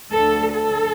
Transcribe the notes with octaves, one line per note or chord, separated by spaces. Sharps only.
D2 D3 A4
A4